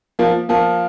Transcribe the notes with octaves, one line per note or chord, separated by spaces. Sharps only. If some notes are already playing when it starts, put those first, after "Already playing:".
F3 A#3
F3 A#3